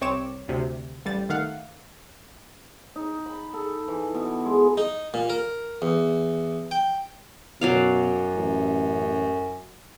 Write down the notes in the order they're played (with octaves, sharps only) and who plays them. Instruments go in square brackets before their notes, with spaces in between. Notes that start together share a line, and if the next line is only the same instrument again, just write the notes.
[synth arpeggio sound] C2 C4 C#5 C#6 D6 E7
D2 C3
A1 G3 A6
D#3 A3 F5 F#5
[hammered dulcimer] D#4
B5
A4
E3
B2
G#3
[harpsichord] D#4
A#2
A#4
E2
G5
[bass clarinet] F#2 [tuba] B2 [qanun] F#3 D5 F5
[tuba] A1